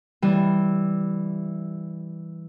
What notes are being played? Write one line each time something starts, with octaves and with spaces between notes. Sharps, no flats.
E3 G3